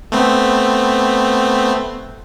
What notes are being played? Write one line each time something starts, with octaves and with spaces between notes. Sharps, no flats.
A3 B3 C4